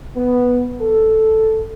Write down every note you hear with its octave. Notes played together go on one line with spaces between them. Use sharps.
B3
A4